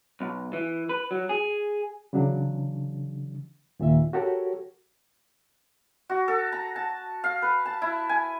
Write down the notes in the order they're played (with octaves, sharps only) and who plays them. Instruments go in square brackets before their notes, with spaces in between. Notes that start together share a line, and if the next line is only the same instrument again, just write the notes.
[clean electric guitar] B1
E3
B4
F#3
G#4
[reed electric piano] C#3 E3 F#3 D4
D#2 A#2 D#3 E5
F#4 G4 A4 A#4 C#5
[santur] F#4
A4
A#5
A5
F5
B4
A5
E4
G#5